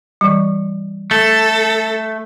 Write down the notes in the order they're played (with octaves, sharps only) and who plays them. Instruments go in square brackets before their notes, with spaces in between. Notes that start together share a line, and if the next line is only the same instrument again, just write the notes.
[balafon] E3 G3
[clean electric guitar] A3 [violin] A4